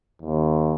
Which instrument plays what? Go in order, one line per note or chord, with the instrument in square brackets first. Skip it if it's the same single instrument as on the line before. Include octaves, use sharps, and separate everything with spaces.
[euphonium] D#2